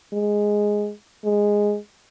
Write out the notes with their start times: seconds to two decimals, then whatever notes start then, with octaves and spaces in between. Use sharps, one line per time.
0.13 G#3
1.25 G#3